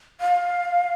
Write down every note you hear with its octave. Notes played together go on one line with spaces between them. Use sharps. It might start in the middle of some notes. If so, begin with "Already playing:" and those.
F5